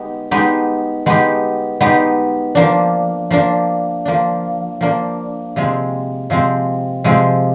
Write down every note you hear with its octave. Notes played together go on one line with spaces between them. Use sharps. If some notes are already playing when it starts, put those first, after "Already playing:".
Already playing: G#3 B3 D#4 G4
G#3 B3 D#4 G4
G#3 B3 D#4 G4
G#3 B3 D#4 G4
F3 A#3 D4
F3 A#3 D4
F3 A#3 D4
F3 A#3 D4
C3 F3 G#3 C4
C3 F3 G#3 C4
C3 F3 G#3 C4